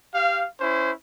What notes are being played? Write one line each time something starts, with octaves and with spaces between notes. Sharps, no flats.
G4 F5
C#4 E4 C5